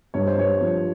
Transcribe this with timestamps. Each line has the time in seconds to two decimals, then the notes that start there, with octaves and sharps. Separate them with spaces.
0.14 G2 C#5
0.27 C5
0.38 G2 C#5
0.61 F3